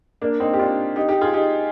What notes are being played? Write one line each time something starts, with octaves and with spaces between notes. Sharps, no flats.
A#3 D4
C4 D#4
G4
D4 F4
D#4 G4
D#4 G4
F4 G#4
D#4 G4